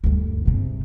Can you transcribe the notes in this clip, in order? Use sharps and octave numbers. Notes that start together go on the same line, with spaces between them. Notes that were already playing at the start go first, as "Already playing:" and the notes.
D2 G2
G#2 C3